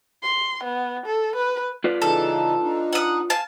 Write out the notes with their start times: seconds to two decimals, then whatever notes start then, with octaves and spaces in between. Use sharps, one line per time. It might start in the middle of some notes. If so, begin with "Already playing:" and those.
0.23 C6
0.63 B3
1.06 A4
1.36 B4
1.84 F4 B4 D5
2.02 C#3 E3 D#4 A4
2.62 D4 D#4
2.93 F#5 D#6
3.30 F5 G#5 A5